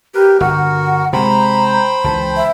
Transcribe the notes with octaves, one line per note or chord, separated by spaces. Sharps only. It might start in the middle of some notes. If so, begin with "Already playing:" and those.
G4 A#4 B4
G1 F#4 A#4 F#5
C3 G#3 C5 G5 A#5 B5
C#2 E3 A5
E5